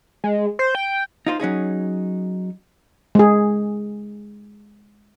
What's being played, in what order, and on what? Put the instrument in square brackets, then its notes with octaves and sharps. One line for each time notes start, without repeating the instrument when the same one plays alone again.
[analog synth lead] G#3
C5
G5
[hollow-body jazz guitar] D#4 F4 C5
F#3 C#4 D#4 G#4
[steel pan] G#3 G#4